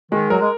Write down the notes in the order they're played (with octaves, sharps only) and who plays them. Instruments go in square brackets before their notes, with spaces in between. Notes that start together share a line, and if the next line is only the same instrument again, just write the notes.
[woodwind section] D#3 [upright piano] G#3
[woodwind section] F#3 [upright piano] A#4
[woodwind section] G#3